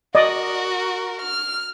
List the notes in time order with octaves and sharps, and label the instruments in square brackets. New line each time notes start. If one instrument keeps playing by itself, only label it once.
[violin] F#4 A#4 [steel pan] D5 D#5
[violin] F6